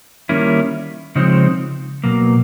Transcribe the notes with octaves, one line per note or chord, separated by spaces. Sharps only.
D#3 G3 A#3 C#4 E4
C#3 F3 G#3 C4 D#4
B2 F#3 A#3